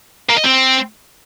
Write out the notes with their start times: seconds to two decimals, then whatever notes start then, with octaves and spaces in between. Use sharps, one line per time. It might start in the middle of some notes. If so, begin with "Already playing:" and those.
0.29 A#3
0.37 D#5
0.44 C4